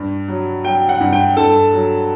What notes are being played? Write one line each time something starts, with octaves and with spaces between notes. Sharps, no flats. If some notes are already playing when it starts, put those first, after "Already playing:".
Already playing: G2
F#3
F#3 G5
F#5
G2
G5
G2 A4 A5
F#3